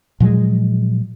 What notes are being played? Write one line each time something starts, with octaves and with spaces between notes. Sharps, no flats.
A#2 F3 F#3 G#3